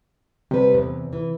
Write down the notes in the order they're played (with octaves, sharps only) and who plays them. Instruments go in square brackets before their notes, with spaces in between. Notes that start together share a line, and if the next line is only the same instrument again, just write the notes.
[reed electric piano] C3 [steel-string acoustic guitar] G3 B4
[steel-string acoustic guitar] E2 G2
E3